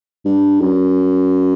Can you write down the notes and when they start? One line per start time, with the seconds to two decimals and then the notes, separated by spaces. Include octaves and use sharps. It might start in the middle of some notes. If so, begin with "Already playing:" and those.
0.25 G2
0.60 F#2